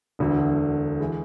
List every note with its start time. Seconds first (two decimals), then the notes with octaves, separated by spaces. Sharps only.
0.19 E1 D2 D3
1.00 E3 G#3